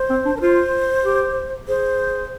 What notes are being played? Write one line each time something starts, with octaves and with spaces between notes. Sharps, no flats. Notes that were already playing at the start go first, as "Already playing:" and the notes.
Already playing: C5
C4
D4
A#4
F4 C5
G4
G#4 C5